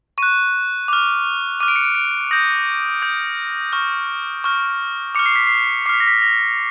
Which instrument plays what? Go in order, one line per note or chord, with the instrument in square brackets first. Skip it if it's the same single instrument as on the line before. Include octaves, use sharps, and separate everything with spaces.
[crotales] C#6 F#6 D#7
D6 F6
D6 F6 D#7
D7
C#7
D7
D7
D#6 G6 A#6
D#6 G6
C#6 F6
C#6 F6
D6 F6 C#7
C7
B6
C7
D6 C7
F6 B6
A#6
B6
A#6